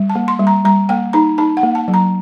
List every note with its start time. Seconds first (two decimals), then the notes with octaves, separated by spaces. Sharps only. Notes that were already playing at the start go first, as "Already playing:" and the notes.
Already playing: G3
0.10 A5
0.15 A#3
0.28 C6
0.39 G3
0.47 A#5
0.65 G3 A#5
0.89 A#3 G5
1.13 D#4 A#5
1.38 D#4 A5
1.57 F#5
1.63 A#3
1.75 A5
1.88 F#3
1.94 A#5